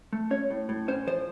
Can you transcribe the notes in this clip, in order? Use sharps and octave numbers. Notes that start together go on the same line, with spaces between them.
A3
C#4 C#5
A2
A2
C#4 C5
F3 C5